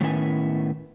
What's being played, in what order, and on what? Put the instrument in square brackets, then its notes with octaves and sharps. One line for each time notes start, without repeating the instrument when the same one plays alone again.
[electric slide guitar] A2 D#3 B3 C#4 E4 G#5